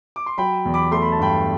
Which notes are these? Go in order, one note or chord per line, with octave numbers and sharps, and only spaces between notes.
D6
C6
F#3 G5 B5
E2
B5 D6
A3 C6
B5
A5
G2 G5 B5